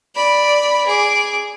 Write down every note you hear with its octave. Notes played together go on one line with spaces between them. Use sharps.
D5 B5
G#4 D6